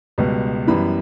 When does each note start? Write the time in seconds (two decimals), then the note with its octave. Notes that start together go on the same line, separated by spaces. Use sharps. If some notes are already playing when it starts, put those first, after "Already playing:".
0.18 C#2 B2 G3 B3
0.67 F#2 E3 G3 B3 B5